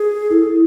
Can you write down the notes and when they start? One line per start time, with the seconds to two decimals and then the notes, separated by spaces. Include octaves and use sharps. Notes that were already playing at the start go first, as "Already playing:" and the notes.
Already playing: G#4
0.30 E4 A4